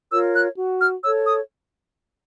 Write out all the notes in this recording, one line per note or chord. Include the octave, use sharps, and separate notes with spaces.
F4 A#4 C#5 E6
F#6
F#4
F6
A4 C#5 E6
D#6